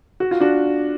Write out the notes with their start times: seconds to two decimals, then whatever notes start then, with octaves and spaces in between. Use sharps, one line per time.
0.20 F#4
0.31 F4
0.41 D4 F#4